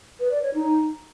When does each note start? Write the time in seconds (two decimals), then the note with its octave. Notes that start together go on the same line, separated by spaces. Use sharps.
0.20 B4
0.31 D5
0.43 C#5
0.54 D#4